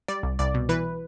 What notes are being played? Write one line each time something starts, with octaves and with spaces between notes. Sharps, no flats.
G3 D5
C2
C2 D5
B2
E3 B4